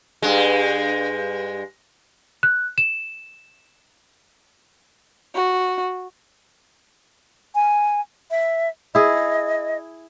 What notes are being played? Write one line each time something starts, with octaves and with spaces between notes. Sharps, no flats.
G2 G#3
F#6
E7
F#4
G#5
E5
E4 G#4 D#5